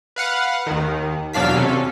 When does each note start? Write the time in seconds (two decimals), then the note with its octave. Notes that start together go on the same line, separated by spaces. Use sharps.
0.16 B4 F5 F#5
0.66 D#2 D#3
1.33 E2 B2 F#3 D4 F5 B6
1.55 C3 C#4 A4